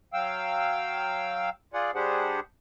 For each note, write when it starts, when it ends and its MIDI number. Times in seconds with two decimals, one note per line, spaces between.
0.13 1.50 54
0.13 1.50 77
0.13 1.50 79
0.13 1.50 88
1.73 1.91 65
1.73 1.91 68
1.73 1.91 74
1.73 1.91 78
1.95 2.40 55
1.95 2.40 62
1.95 2.40 67
1.95 2.40 68
1.95 2.40 72
1.95 2.40 78